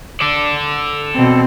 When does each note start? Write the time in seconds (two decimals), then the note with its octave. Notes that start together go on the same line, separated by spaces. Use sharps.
0.21 A4 D5
1.15 B2 C4